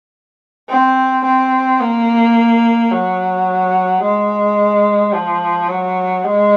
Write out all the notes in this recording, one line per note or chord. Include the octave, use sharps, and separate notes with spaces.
C4
C4
A#3
F#3
G#3
F3
F#3
G#3